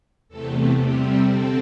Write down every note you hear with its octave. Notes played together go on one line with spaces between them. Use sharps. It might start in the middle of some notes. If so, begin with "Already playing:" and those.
E2 C3 A3 A4
C3 G3 C4 G4
D3 C4 A4